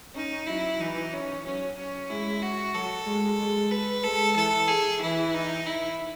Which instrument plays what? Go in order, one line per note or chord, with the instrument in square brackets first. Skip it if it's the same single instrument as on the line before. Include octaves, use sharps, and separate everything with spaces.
[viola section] C#4 [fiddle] D#4
[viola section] F#3 [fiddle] E4
[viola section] E3 [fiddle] D#4
[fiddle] C#4
[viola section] F#3 [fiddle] C#4
[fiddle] C#4
[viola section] G#3 [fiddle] E4
[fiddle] F#4
[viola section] F#3 [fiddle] A4
[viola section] G#3
G#3
[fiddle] B4
[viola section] G#3 [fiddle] A4
[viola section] E3 [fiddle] A4
[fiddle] G#4
[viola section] E3 [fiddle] E4
[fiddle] D#4
E4